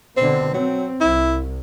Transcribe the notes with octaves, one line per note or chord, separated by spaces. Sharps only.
B2 D3 C4
F#3 C4
C2 E4